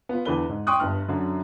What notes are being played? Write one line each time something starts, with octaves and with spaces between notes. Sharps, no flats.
B3 F4
E2 D3 B4 G7
G#2
G5 C6 C#6 D#6 F#6
G1 G2 F6
F#2 D3 F#3